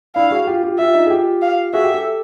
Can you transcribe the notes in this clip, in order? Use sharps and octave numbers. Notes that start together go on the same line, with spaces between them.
D4 E4 F5
F#4 G#4
F4 G4
F4 G4
F4 G4 E5
D#4 F4
G#4
F4 G4
F5
F#4 G#4 E5
G4 A4
G4 A4